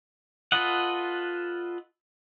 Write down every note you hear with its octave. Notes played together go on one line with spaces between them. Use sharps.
F4 A4 B4 D#5 F#5